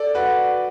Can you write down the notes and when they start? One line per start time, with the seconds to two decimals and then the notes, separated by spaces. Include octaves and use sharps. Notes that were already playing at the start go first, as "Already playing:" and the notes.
Already playing: A4 D5
0.15 F#4 B4